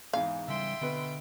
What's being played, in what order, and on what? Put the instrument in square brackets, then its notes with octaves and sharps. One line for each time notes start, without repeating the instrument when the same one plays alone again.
[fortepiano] E2 G#2 [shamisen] F5
[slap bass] C#3 G3 [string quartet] E5 G5 C6
[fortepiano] B2 B4 [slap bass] D3